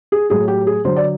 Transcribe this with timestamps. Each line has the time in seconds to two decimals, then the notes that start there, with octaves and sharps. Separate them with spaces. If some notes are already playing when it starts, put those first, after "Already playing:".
0.12 G#4
0.30 A2 F#3 G#4
0.48 G4
0.67 G#4
0.85 D3 F#3 C5
0.96 D5